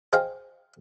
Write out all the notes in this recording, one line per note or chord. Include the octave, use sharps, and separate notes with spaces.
G#4 C5 D#5 F5 G5